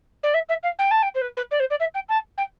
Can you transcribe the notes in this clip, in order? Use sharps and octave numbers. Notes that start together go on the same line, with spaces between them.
D5
E5
E5
F5
G5
A5
G5
C5
B4
B4
D5
C5
D5
E5
G5
A5
G5